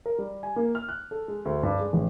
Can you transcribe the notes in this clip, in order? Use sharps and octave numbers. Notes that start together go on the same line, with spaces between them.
A#4
G3
G#5
A#3
F6
F#6
A4
G#3
D2
G2
G#3
A1